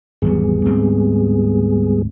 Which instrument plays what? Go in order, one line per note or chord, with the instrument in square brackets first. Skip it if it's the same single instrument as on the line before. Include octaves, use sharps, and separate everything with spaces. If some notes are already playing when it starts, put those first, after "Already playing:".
[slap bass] G#1 E2 F#3 [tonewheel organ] G3 B3 G#4
[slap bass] D1 G#2 C4